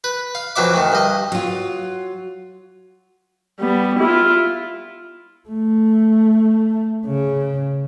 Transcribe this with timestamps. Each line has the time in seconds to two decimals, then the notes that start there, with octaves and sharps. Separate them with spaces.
0.04 B4
0.35 F5
0.56 F2 E3 F#3 E5 D6
0.74 D2 D#3
0.92 G2 D#5
1.32 F#3 F4
3.59 G3 B3
3.99 E4 F4
5.49 A3
7.07 C#3